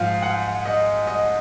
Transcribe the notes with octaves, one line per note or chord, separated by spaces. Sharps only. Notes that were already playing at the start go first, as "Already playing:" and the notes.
Already playing: G#2 F3 F5
F#5
D#5
D#5